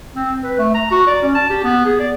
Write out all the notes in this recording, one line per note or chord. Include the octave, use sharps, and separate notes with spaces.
C4
B4
A3
A#5
F#4
D5
C#4
A5
G4
B3
G#4
D5